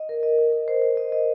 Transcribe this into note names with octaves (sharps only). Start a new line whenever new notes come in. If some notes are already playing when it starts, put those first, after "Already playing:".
Already playing: D#5
A#4
D#5
D#5
A#4
C5
D#5
D#5
D#5